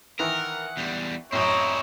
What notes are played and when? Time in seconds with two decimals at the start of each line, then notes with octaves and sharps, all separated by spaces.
0.19 D#3 E3 A#4 F#5
0.77 E2 G3
1.32 A1 F#2 C4 E4 C#5 D#5 A#5